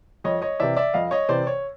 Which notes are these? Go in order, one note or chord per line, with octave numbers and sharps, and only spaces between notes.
F2 C#5 D#5
C#5 D#5
C3 E3 D5 E5
D5 E5
F2 D#5 F5
C#5 D#5
C3 E3 C5 D5
C#5